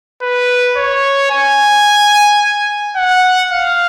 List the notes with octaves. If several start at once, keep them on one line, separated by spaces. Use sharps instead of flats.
B4
C#5
G#5
F#5
F5